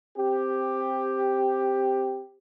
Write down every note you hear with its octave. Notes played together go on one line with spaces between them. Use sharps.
C4 G4